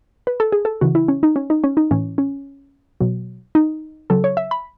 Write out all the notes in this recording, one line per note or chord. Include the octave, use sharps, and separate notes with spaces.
B4
A4
G#4
A4
C#3 E3 F#4
E4
C#4
D#4
C#4
D#4
C#4
D#4
A2 E3 C#4
C#4
B2 F#3
D#4
C#3 F#3 A4
C#5
E5
B5